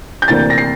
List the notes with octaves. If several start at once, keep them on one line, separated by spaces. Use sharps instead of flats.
G6
D2 C3 E3 A#3 D4 A6
A#6
C7